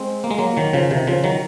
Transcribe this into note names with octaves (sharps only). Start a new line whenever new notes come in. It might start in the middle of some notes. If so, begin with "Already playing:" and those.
Already playing: G#3 C4
A#3
G#3
F#3 A#3
D#3 F#3
C#3 F3
C3 D#3
C#3 F3
D#3 F#3